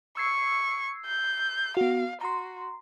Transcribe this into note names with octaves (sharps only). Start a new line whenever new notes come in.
C#6 E6 G#6 C7
G6
B3 F#4 F5
F#4 A#5 C6